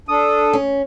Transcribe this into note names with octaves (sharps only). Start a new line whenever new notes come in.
D4 A4 D#6
C#4